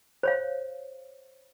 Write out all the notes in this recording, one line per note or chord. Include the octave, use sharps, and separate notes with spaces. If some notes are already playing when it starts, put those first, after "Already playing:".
C5 C#5 F5